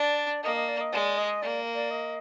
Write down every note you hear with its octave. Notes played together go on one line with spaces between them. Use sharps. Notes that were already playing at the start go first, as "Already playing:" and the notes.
Already playing: D4 D5
A#3 D#5
D#5
D5
D#5
G#3 D5
D#5
A#3 D5
D5
D#5